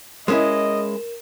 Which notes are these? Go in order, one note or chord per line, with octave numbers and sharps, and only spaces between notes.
G#3 C#4 E4 A#4 D#5 E7